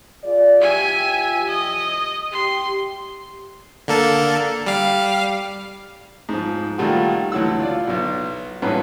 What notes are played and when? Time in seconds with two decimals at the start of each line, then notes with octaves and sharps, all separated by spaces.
0.24 F4 G#4 D5
0.61 F3 G4 E5 G#5
1.48 D#5
2.32 G4 C6
3.88 D3 A#3 A4
4.66 G3 F5
6.29 G#2 F3
6.78 A#2 D#3 G3 A3 F4 F#4
7.32 D2 E3 F#3 F#5 E6
7.59 F4 D5
7.87 B1 B2
8.62 A1 G2 A#2 C#4 B4 F#5